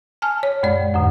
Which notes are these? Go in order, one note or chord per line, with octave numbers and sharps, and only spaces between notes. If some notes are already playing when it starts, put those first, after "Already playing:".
G#5 A5 F6
C#5
F#2 A#2 G#3 D5
F2 A2 D3